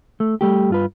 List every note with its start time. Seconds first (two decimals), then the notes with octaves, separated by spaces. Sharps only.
0.20 A3
0.41 G3 A3 G4
0.70 G2 F4 B4